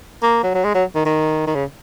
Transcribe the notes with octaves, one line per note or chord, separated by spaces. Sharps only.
A#3
F#3
F#3
G#3
F#3
D#3
D#3
D#3
C#3